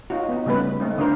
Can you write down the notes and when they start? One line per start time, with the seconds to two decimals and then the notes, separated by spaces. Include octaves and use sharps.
0.10 D#4 F4 F#4
0.29 B3 D#4
0.46 C#3 G3 A3 B3 B4
0.80 A3 C4 D#4
0.98 D3 D4 E4 A#4 C5